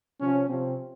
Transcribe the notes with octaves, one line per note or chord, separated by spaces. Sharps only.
C3 F3 C#4
C3 F3 C4